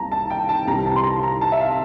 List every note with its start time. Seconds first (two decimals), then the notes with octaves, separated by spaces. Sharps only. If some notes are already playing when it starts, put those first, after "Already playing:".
Already playing: C2 C3 G3 A#3 A5 A#5
0.12 A5
0.30 G5
0.49 A5
0.67 C2 C3 E3 G3 C4 A#5
0.86 A5
0.96 C6
1.04 A#5
1.23 A#5
1.41 A5
1.52 E5
1.60 F5